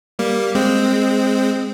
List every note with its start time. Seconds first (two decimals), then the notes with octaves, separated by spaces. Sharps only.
0.19 G3 A#3
0.55 G#3 C4